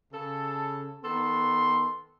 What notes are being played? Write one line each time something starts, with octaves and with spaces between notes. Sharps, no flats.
C#3 A4
D#3 B3 A4 C6